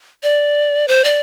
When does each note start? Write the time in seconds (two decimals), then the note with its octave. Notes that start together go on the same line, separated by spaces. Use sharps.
0.23 D5
0.88 C5
1.04 D5